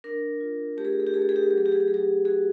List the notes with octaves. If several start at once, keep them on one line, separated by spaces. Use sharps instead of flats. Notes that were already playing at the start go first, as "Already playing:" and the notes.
D4 A#4
F4
A3 G4
G#4
G4
G#4
G4
A3 G#4
G4
G#4
G4
G#4
F#3 G4
G#4
G4
G#4
G4
F#3 G#4
G4
F#4 G#4